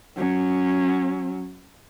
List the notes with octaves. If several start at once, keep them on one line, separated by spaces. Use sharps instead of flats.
F#3 C#4